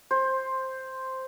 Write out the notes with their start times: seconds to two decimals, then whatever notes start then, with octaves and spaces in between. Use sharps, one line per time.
0.11 C5